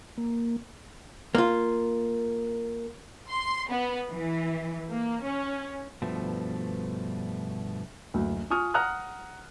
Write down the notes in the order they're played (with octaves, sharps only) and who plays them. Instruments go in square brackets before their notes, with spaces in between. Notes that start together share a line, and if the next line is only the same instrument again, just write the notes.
[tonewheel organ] A#3
[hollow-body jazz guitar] A#3 F4
[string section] C6
B3
E3
A#3
C#4
[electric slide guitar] G2 B2 F3 A3
[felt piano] F#1 D2
F4 G#5 C#6 D#6 F6
F#5 A#5 D#6 F6 F#6